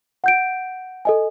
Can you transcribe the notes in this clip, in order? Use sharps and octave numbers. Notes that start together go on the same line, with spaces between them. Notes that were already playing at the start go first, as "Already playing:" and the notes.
F#5 G6 D7
A4 D#5 G#5